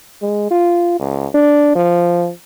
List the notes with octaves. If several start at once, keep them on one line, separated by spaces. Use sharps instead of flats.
G#3
F4
C#2
D4
F3